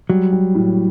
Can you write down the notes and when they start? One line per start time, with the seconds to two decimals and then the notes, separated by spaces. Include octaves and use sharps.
0.10 F#3 G3
0.33 G3
0.55 A2